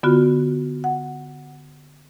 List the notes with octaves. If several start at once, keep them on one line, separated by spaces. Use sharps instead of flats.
D3 B3 F4 F#4
F#5